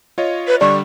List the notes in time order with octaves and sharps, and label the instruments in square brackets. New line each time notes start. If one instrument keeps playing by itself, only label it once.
[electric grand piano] F4 C#5 D#5
[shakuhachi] B4
[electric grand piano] D3 G3 D4 [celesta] D5 [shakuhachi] C#6